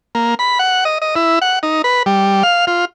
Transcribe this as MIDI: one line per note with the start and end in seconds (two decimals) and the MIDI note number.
0.15 0.35 58
0.39 0.59 83
0.59 0.84 78
0.85 0.98 75
1.02 1.15 75
1.16 1.39 64
1.42 1.59 78
1.63 1.82 63
1.84 2.03 71
2.06 2.43 55
2.43 2.65 77
2.67 2.85 65